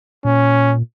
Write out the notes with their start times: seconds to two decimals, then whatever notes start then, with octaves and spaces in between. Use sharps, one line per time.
0.25 A#2 C#4